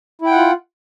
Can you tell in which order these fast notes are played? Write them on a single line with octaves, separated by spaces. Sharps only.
E4 G5 F#5 F4